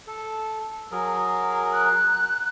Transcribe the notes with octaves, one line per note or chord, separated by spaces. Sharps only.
A4
F#3 G#4 A#4
F#6